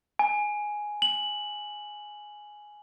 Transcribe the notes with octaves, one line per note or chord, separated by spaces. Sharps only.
G#5
F#7